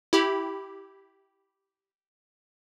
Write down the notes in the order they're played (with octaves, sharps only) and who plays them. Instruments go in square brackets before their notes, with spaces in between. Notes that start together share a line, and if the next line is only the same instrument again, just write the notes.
[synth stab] E4 G4 B5